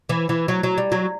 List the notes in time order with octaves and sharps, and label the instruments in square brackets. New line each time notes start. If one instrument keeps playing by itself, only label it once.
[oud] E3
E3
F#3
F#3
G3
F#3